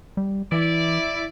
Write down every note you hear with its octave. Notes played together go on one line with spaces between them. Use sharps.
G3
E3 E4 D5